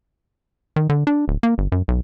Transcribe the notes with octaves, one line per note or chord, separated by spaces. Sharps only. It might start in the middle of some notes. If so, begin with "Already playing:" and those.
D#3
D3
D4
D1
A#3
G1
F#2
B1